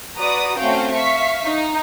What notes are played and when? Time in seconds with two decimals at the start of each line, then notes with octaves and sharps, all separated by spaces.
0.18 F#4 B4 D5 A#5 D#6
0.57 A3 C4 C#4 F#4 F5 G5
0.92 E5 F5 C#6 B6
1.45 D#4